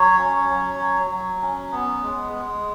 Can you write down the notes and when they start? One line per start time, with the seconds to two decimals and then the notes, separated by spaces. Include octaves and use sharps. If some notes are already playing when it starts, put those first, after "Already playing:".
Already playing: F#3 C#5
0.19 C#4
0.49 F#3
0.80 F#3
1.10 F#3
1.42 C#4
1.72 B3
2.03 G#3
2.33 G#3